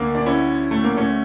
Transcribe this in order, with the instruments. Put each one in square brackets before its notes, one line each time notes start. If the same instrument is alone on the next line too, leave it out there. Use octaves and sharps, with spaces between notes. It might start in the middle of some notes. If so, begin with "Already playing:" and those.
Already playing: [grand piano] D2 D3 A#3
D4
C#4 E4
A3
A#3
A3 C#4